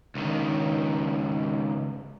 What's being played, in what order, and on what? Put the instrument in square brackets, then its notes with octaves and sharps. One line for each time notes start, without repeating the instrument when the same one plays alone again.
[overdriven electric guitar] C#2 D#3